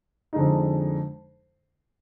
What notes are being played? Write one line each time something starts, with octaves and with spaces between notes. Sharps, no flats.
F2 D3 G#3 D#4